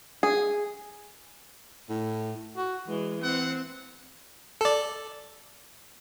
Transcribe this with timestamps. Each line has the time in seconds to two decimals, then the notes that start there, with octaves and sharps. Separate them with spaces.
0.23 G#4
1.89 A2
2.57 F#4
2.88 E3 G#3
3.23 C4 F#5
4.61 A4 D5